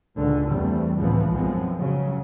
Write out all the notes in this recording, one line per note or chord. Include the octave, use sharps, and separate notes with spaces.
C#2 A#2 D3 D#3
E2 E3 G3 A3 C4
C#2 A2 C#3 E3 F3 B3
B1 F#2 F3 G#3 B3 C4
C#3 F#3